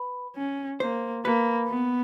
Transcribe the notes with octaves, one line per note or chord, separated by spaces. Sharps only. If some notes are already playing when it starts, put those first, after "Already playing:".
Already playing: B4
C#4
A#3 C5
A#3 B4
B3